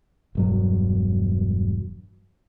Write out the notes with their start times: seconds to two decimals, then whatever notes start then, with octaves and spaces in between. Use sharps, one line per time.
0.35 E1 G2 F#3